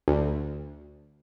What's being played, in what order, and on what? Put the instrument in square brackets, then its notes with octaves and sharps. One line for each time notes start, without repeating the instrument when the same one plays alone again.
[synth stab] D2